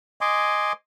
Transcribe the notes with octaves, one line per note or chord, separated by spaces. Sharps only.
D#5 G#5 C6 D6